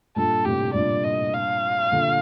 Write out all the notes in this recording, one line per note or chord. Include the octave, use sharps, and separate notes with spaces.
G2 A#2 A4
A2 C3 G4
G2 A#2 D5
D#5
F5
A#2 D3